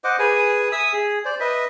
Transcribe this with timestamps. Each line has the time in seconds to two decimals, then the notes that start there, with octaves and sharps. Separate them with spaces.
0.04 C5 D#5 F#5 D6
0.19 G#4 B4 G#5
0.72 E5 G#5 D#6 E6
0.93 G#4
1.25 C5 D5
1.40 B4 D#5 E5